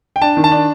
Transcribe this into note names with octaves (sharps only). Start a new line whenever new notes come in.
G5
D4 A5
D#3
A5
D4